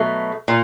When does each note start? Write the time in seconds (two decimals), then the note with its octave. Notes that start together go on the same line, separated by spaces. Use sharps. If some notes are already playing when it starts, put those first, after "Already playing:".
Already playing: B2 F#3 A3
0.48 A#2